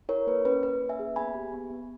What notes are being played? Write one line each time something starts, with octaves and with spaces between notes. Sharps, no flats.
E4 A#4 C#5
A#3 B4
C#4 B4
A#3 B4
A#3
E5 G#5
G#4
B3 G#5 B5
G4
B3
B3